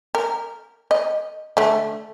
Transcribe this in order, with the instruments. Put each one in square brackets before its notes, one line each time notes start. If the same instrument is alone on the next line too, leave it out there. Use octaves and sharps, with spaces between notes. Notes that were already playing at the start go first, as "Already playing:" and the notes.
[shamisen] A#4
D#5
D3 A3